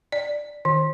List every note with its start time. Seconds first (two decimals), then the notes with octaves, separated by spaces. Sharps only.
0.12 D5
0.65 D#3